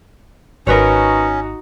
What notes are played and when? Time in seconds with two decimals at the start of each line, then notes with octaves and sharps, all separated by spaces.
0.67 G#1 C#4 D#4 F#4 A#4 B4 C#5